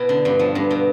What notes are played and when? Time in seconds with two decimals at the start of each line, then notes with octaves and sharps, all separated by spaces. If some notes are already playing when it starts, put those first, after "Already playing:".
Already playing: B2 E4
0.09 D3
0.25 G2
0.39 F3
0.55 G2
0.71 B2